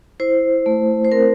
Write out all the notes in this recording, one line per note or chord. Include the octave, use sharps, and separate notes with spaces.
E4 C5
A3
C5
C4 A#4